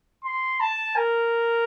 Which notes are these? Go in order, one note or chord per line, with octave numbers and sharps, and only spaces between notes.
C6
A5
A#4